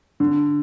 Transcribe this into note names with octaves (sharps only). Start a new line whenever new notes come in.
D3